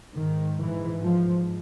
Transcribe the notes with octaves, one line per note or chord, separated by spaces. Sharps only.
G#2 D#3
E3
F3